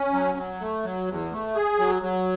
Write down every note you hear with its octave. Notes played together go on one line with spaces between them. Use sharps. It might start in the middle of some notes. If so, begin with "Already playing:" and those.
Already playing: C#4
F#3
F#3
A3
F#3
E2
A3
G#4
F#3
F#3